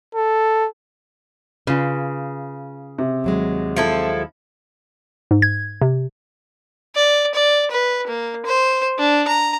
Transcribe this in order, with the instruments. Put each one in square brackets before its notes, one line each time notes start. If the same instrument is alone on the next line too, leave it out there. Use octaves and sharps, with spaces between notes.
[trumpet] A4
[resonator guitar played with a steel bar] C#3 [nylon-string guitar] F4 B4
[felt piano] C3
[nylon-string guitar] D#2 F#3 G#3
[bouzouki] F3 E4 A4
[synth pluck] G#2
G#6
C3
[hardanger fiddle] D5
D5
B4
A#3
C5
D4
A#5